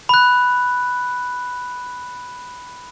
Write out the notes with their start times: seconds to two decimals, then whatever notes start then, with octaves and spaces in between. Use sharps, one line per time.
0.09 B5 F#6